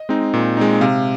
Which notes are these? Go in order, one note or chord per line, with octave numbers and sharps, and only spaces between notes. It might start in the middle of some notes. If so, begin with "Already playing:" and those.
Already playing: D#5
G#3 C4 D#4
A#2
G#3 C4 D#4
C3 F5